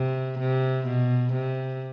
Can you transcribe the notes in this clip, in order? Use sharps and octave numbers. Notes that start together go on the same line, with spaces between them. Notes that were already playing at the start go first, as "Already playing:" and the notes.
Already playing: C3
C3
B2
C3